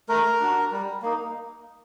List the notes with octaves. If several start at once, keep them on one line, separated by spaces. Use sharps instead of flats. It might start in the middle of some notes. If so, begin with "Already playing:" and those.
A3 A#4 A#5
D4 F#4
G3
A#3 D#4